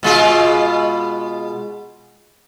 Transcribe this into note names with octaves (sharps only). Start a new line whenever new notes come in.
B2 G#3 F4